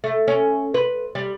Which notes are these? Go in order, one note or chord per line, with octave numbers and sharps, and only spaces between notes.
A3
C#4
B4
G3